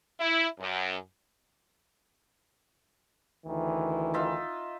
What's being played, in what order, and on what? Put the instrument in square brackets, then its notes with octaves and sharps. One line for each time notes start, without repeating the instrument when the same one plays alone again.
[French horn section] E4
F#2
[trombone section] D2 D#3 E3
[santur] D#4 F4 E5